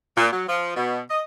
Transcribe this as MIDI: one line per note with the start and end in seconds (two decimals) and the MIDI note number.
0.17 0.28 46
0.32 0.45 54
0.48 0.74 53
0.76 1.01 47
1.10 1.21 75